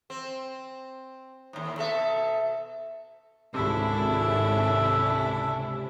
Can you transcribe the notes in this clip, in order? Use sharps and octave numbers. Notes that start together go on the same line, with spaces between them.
C4
D#2 A2
B2 A4 E5
G#1 C#2 C3 C#4 D4 E4 A4 E5